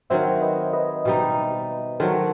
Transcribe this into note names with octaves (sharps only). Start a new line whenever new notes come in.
D#3 F#3 C4 C5 E5
B4 D#5
B4 D#5
B2 G3 D#4
D#3 F#3 A3 A4 C5